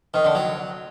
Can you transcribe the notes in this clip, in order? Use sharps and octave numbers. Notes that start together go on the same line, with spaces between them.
D#3
D3
F#3